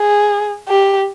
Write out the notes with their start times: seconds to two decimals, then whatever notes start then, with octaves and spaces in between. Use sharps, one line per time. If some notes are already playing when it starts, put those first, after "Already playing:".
Already playing: G#4
0.69 G4